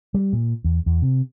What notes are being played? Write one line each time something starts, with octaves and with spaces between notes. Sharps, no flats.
G3
A#2
E2
E2
C3